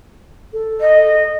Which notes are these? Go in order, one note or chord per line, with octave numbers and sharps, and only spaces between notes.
A4
D#5